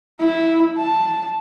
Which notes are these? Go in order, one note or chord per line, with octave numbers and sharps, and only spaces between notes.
E4
A5